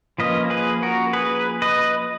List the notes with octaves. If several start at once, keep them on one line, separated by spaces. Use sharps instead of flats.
F3 A#3 C#4 B4 D#5
G#4 B4
F#4 A#4
G#4 B4
B4 D#5